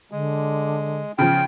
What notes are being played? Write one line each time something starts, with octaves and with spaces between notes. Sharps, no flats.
D3 G#3
C#3 F3 G5